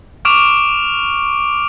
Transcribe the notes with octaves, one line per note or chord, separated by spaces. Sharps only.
C#6 D6 F6 D7 E7 F7